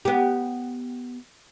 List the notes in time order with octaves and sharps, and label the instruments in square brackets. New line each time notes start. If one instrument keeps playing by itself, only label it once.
[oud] B3 G4